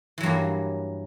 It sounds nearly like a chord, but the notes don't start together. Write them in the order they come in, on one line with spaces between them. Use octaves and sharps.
E3 F#3 G2 A#3